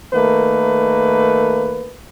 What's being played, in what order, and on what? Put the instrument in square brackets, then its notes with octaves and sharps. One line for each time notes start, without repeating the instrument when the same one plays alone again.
[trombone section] D#3 A3 A#3 B4